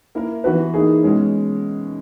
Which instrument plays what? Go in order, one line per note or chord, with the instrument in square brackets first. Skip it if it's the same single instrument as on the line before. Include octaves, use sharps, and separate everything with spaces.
[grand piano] A#3 E4 A#4
E3 B3 F#4 B4
E3 A#3 D#4 G#4
B2 G#3 C#4